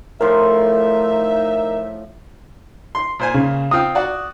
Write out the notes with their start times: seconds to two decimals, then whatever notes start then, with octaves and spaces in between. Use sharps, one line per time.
0.21 A2 F3 D#4 F4 A#4 E5
2.95 C6
3.19 A#2 C5 G#5
3.34 C#3
3.71 C4 F4 G5 D#6
3.95 F#4 D5